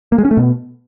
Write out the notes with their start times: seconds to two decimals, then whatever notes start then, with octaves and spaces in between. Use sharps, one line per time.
0.12 A#3
0.18 G#3
0.25 C#4
0.31 A3
0.37 B2